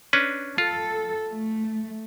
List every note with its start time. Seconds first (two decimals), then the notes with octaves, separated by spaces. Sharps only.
0.13 C#4 D4 B4
0.58 F4 A4
1.29 A3